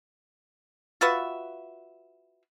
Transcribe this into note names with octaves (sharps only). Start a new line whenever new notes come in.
F4 F#4 B4 E5